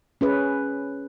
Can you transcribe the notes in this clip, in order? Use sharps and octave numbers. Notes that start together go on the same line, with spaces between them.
C#4 G#4 B4